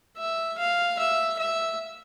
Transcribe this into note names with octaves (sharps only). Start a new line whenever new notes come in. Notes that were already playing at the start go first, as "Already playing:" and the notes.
E5
F5
E5
E5